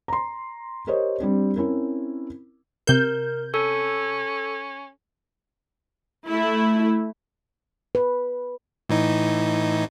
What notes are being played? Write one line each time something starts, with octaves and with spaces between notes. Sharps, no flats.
A#5 C6
G4 A#4 C5 C#5 D#5
G3 C4 D4
C4 C#4 E4 A#4
C3 A#4 G6
C#4 A4
A3 E4
B4
A2 E3 D#4